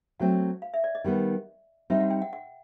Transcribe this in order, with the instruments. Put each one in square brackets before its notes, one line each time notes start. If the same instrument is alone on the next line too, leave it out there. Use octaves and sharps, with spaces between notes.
[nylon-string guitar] F#3 A3 C4 [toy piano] F#5
[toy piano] F5
E5
D5
D#5
[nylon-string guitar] D#3 G3 B3
[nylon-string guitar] G3 C4 D#4 [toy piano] E5
[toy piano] F#5
G5
F#5
F#5